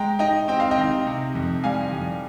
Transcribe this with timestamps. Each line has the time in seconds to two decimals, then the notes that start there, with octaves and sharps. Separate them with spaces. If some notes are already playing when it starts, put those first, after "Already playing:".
Already playing: G#3 G5 A#5
0.19 D#4 D#5 G5
0.48 C4 G5
0.60 F5
0.71 D#5 G5
0.77 D#3
1.07 C3
1.35 F2
1.64 G3 F5 G#5
1.93 F2